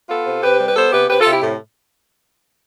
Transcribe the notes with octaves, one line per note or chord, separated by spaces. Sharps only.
B3 F4 A4
C3
C3 G4 B4
G3
B4
B3 A4 C5
C3 G4 B4
C3 G4 B4
F4 A4
C3
E4 G4
A2